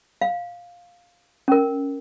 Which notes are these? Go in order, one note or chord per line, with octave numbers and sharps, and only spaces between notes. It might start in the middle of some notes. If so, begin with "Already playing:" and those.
F5
C#4 A#4